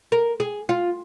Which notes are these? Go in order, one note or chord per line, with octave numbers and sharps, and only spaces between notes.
A#4
G#4
F4